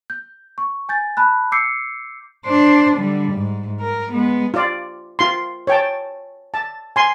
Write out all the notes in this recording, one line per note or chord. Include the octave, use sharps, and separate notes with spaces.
G6
C#6
G#5 G6 A6
A5 B5 F#6
D6 E6 G6 C7 C#7
D4 C5
D3 G3
G#2
A#4
G#3 B3
F4 D5
F4 C6
C#5 G5 A5
A5
G#5 C6